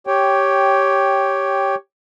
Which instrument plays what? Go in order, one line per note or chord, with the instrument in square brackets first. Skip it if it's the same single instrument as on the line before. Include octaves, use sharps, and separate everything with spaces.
[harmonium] G4 C#5 G5